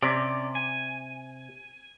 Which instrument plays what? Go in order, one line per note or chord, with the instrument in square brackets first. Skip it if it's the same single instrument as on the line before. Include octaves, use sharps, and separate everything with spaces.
[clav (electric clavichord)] C3 [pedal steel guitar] C#4 D5
[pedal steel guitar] G#5